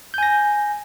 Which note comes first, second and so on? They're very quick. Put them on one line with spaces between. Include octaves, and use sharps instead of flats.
G6 G#5 A#6